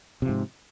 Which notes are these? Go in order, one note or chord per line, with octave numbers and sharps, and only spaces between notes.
G#2 C3 F3